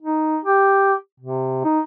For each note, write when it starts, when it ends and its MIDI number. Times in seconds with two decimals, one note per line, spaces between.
0.02 0.38 63
0.45 0.94 67
1.20 1.62 48
1.64 1.80 63